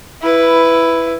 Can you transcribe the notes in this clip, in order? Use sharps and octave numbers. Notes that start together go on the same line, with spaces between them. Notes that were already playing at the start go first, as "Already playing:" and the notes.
E4 B4